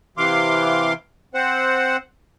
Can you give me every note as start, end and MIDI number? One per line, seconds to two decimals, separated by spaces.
0.17 0.93 48
0.17 0.93 52
0.17 0.93 77
0.17 0.93 84
0.17 0.93 86
1.34 1.97 60
1.34 1.97 72
1.34 1.97 78